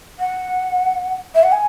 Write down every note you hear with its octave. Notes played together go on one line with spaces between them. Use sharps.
F#5
E5
F#5
G#5